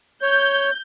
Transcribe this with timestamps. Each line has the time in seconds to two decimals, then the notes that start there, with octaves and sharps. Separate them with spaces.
0.22 C#5 G6